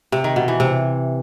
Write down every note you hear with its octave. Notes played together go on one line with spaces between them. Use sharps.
C3
D#3
B2
E3
C3